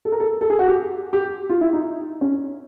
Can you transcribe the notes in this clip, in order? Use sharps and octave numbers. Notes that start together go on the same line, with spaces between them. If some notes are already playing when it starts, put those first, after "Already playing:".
A4
A#4
A4
A4
G#4
F#4
G4
G4
F4
E4
D#4
C#4